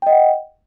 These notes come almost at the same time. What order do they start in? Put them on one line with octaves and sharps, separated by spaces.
G5 D#5 F#5